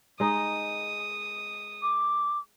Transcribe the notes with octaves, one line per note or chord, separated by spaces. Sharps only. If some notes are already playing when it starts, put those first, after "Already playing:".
G#3 D#4 D#6
D6